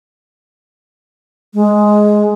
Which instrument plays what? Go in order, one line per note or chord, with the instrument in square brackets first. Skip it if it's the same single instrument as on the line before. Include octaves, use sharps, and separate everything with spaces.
[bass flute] G#3